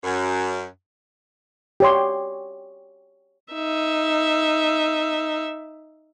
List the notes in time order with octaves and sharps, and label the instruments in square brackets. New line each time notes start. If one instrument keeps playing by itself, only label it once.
[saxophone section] F#2
[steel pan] G4 C#5 C6
[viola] D#4 E5